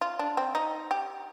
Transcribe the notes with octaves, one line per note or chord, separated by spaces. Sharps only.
F4
D4
C4
D#4
G4